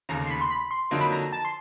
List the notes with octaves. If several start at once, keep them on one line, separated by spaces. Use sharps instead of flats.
F1 D#2 C#3 A#5
C6
B5
C6
B5
C6
F2 D3 F#3 A#3 D#4
B5
A#5
A5
C6